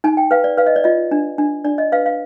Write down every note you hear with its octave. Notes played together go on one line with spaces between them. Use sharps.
D#4 G#5
G5
B4 F5
D5
B4 F5
D#5
D5
F4 D#5
D4
D4
D4 D5
D#5
B4 F5
F5